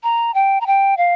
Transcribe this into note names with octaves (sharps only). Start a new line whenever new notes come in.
A#5
G5
A#5
G5
F5